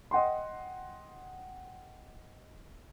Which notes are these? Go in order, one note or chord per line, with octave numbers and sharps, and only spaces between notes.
D#5 F#5 G5 C6